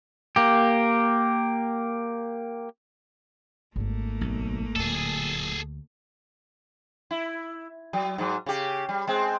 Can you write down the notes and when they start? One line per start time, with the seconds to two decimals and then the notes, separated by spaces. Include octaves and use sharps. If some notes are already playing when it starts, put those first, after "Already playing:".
0.36 A#3 G4
3.76 G#1 A3 A#3 D#4
4.21 B1
4.76 D1 D2 A#2 G#4 A4
7.11 E4
7.93 F#3
8.18 G#2 F#3
8.46 C#3 G4
8.89 G3
9.07 G#3 C4